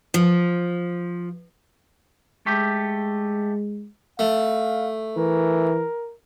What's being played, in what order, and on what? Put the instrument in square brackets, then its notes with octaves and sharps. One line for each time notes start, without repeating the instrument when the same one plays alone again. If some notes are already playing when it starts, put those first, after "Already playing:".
[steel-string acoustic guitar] F3
[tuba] G#3 [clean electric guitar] A3 G4
[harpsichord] A3 [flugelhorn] F5
[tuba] E3 [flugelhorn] A#4